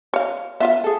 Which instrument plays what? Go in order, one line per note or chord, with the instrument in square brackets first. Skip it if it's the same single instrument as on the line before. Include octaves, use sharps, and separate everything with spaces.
[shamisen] C#5 F5
[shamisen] B3 F4 F5 [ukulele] E5
[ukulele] G#4 A4